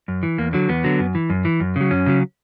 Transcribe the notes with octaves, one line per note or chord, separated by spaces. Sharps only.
F#2
E3
E2 A#3
D3 F#3
E2 B3
D3 F#3
F#2
E3
F#2
E3
F#2
C#3 F#3
F#2 C#4
C#3 F#3